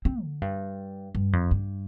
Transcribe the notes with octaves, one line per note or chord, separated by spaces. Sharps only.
C4
D3
G2
G2
F2
G2